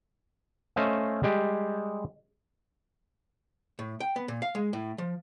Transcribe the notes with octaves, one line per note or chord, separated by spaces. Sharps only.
A3 C#4 C5 D#5 F5
G3 G#3 G4
A2
G5
B3
A#2
F5
G#3
A2
F3